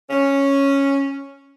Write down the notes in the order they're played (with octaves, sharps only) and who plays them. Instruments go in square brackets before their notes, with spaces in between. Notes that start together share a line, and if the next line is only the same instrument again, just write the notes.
[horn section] C#4